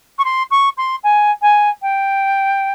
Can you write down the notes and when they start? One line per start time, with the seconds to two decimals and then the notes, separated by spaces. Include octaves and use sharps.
0.18 C#6
0.25 C6
0.51 C#6
0.78 C6
1.04 G#5
1.42 G#5
1.82 G5